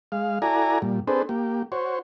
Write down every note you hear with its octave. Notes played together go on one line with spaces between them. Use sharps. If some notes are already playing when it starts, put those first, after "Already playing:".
G#3 F5
E4 F#4 A4 D5 G#5 A#5
A#2 G3
C4 D4 G#4 A4 B4 C5
A#3 G4
F#4 C5 C#5